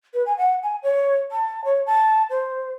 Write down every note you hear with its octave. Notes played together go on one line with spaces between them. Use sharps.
B4
G#5
F#5
G#5
C#5
A5
C#5
A5
C5